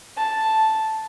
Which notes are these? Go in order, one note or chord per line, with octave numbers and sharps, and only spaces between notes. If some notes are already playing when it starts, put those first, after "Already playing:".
A5